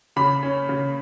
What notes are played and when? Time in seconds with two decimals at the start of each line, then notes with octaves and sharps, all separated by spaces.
0.16 C#3 B5
0.43 C#4
0.69 C#3